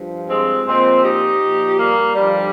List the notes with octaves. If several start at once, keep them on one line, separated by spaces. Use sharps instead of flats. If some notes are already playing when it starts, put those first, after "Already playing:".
Already playing: G2 F3
G#3 C4
A#2 F3 G#3 C4
D#4 G4
A#2 F3
G3 A#3
G2 D3 F3 G3